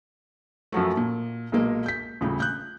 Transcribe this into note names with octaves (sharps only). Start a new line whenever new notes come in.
F#2 F3 F#3 A3
A#2
B1 A#2 G#3 A#3
G6 B6
D#1 A2 C#3
F#6 G6